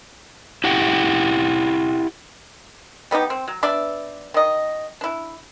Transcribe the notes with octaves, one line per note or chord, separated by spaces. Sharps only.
E4 G4 F#5 G5
G3 B3 D#4 G4
C4
F#3
B3 D4 D5 E5
D#3 D#5
D4 E4